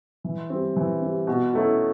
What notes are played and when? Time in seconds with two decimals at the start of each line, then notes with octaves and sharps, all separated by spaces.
0.24 E3
0.50 G3 C4
0.76 E3
1.02 G3 C4
1.27 B2
1.53 F#3 A3 C#4 E4